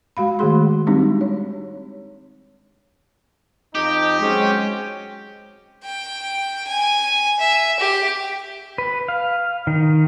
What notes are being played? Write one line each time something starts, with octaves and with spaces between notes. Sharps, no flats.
G#3 F#4 F5 B5
D#3 G#3 A3 F#4 G#4 C6
G3 G#3 C4 D4 D#4 G4
C#5
F2 D#4 G4
F#3 G#3 C4 C#4
G5
G#5
E5
G4
B4
F5
D#3